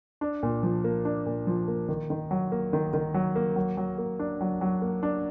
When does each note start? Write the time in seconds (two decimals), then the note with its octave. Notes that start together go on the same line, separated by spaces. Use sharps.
0.21 D4
0.43 A#2
0.63 F3
0.84 A#3
1.05 D4
1.26 A#2
1.47 F3
1.68 A#3
1.89 D#3
2.10 D#3
2.31 F#3
2.52 A#3
2.73 D#3
2.93 D#3
3.14 F#3
3.36 A#3
3.56 F#3
3.77 F#3
3.98 A#3
4.19 D4
4.41 F#3
4.61 F#3
4.82 A#3
5.03 D4